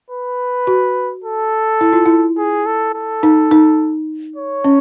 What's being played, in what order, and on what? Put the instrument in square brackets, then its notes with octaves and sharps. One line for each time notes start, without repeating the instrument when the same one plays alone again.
[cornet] B4
[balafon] F#4
[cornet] A4
[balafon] E4
F4
E4
[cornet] G#4
A4
A4
[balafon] D#4
D#4
[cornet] C#5
[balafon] C#4